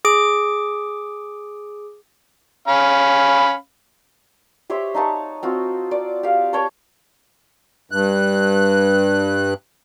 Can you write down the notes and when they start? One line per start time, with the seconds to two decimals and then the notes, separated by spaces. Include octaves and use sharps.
0.05 G#4 D6 D7
2.68 C#4 F5 B5
4.70 G4 C5 C#5 E5
4.94 D#4 F#5 A5 C#6
5.43 C4 F4 F#4
5.91 D5
6.23 G4 F5
6.53 C#5 G5 A5 C#6
7.91 G2 F#6